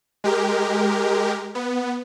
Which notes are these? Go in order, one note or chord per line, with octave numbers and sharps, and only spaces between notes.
G#3 G4 A#4
B3